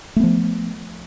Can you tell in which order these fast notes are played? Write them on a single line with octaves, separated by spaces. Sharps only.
A3 B3 F3